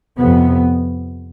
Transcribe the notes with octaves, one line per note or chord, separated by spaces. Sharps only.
F2 C3 B3